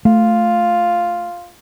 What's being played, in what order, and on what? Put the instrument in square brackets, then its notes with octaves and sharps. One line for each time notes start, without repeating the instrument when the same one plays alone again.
[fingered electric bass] A3 [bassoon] F4